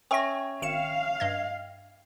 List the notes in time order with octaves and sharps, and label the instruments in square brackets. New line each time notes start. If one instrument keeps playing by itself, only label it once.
[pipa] C#4 [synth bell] E5 G5 [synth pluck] C#6 A#6
[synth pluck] G#1 C#7 E7 [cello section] F5
[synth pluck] G2 D#5 G#6